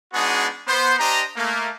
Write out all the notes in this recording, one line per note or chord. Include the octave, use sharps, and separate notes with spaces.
G#3 B3 D4 D#4 F#4 G#4
B3 C5
D4 G4 C5 D#5 A#5
A3 A#3